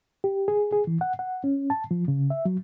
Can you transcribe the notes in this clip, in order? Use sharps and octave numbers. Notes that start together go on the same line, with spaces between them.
G4
G#4
G#4
E3
F#5
F#5
C#4
A5
F3
C#3
E5
F#3